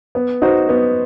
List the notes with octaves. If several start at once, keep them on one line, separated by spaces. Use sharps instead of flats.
B3
D#4 F#4 C5
B3